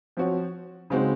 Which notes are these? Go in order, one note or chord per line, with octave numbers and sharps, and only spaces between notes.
F3 C4 F#4 C#5
C#3 G#3 C4 D#4 F#4